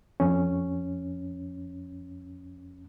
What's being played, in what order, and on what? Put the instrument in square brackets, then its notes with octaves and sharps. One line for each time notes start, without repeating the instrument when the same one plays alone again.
[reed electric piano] F2 C#4